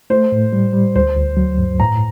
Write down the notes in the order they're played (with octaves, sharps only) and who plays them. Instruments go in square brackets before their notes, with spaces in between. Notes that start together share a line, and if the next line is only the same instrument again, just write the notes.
[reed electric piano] A3 [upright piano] C5
[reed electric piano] A2
G3
G3
[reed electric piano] D2 [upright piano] C5
[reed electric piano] D2
F#3
G2
[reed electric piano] A2 [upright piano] A#5